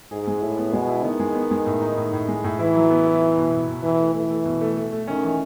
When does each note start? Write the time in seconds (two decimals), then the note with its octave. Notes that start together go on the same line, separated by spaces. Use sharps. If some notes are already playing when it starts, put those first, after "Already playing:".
0.11 G#2 G#4
0.27 G#3
0.42 A2 E4
0.58 B3
0.73 B2 G#3
0.89 E4
1.04 D#3 B3
1.20 G#3
1.35 B3
1.51 G#3
1.66 A2
1.82 D#4
1.97 A2
2.13 A2
2.28 G#3
2.44 A2
2.59 E3 E4
2.75 F#3
2.90 B3
3.06 E4
3.22 E4
3.37 B2
3.52 B2
3.68 B2
3.83 E3 E4
3.99 A3
4.14 E3 A3
4.30 A3
4.45 B2
4.61 A3
4.77 A3
4.92 A3
5.08 D#3 C#4
5.23 E3